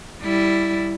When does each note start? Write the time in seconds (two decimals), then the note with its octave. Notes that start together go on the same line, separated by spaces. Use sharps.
0.22 G3 E4